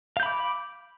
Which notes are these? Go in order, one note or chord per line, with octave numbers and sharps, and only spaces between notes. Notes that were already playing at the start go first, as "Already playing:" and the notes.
F5 B5 D6 G6